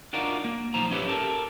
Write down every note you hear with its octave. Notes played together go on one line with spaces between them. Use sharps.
D4 D#4 F4 F#4 A#4 D5
A#3
B1 F3 D#4 C5 A#5
C#4 E4 G4 B4 C#5
G4 A4 A#4